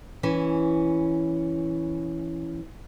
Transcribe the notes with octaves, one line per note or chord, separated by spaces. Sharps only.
E3 C#4